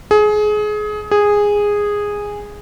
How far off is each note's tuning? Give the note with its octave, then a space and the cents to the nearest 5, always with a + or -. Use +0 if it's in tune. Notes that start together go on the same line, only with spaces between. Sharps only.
G#4 +25
G#4 -10